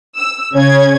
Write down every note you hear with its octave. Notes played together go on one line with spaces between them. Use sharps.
E6
C#3 C#4 G#6